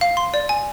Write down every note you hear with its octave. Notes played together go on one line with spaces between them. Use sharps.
F5
C6
D5
G#5